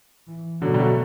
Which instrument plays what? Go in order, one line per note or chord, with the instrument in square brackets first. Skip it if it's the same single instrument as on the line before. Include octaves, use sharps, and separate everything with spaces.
[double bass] E3
[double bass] B2 [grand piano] D3 F#3
[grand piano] G3
F#3 A3